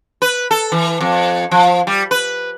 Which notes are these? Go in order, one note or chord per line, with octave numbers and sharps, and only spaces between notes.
B4
A4
E3
F2
F3
G3
B4